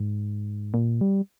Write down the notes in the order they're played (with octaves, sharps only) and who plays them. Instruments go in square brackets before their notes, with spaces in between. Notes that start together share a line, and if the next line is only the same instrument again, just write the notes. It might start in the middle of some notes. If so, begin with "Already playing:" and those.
Already playing: [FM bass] G#2
A#2
G3